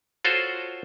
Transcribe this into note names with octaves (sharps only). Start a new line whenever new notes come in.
F4 F#4 A4 C5 C#5